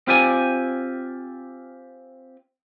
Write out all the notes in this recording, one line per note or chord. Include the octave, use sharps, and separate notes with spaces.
C4 F4 G4 D5 G#5